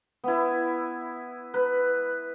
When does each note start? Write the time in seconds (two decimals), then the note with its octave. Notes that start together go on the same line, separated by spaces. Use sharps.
0.24 B3 E4
1.54 B4